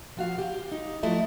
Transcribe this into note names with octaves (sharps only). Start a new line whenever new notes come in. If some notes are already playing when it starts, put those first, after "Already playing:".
F3 F#4 F5
G4
D#4
F3 F#3 A3 E4 A4 D#5